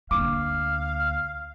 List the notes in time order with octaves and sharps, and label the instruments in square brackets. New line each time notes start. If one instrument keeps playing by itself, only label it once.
[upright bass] D2 A#3 [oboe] F5 [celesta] D6